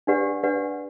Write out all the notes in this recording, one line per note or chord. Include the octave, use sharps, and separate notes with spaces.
D4 G4 B4 D5 F#5
D4 G4 B4 D5 F#5